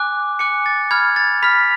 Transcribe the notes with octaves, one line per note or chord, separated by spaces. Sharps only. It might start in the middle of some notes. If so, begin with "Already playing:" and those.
Already playing: G#5 D6 F#6
G#5 D6 F#6 C#7
A6
B5 F6 G#6
A6
B5 F6 B6